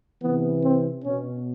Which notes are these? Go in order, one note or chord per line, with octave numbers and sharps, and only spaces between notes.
C3 E3 B3
C4
B2 C#4